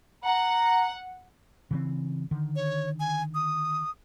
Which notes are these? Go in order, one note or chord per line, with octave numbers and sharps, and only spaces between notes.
F#5 A#5
C#3 E3 C4
D3 D#3
C#5
G#5
D#6